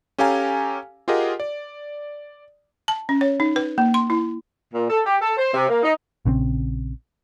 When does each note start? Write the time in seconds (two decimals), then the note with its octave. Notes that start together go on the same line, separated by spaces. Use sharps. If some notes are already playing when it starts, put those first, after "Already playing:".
0.18 C#4 G4 A4 F5 G#5 A#5
1.08 F4 G4 G#4 A#4 D#5 F#5
1.40 D5
2.88 A5
3.09 C#4
3.21 C#5
3.40 D#4
3.56 B4
3.78 A#3
3.94 C6
4.10 E4
4.74 A#2
4.90 A4
5.06 G4
5.21 A4
5.37 C5
5.54 C3
5.69 A#3
5.83 D#4
6.25 A#1 C#3 F3 C4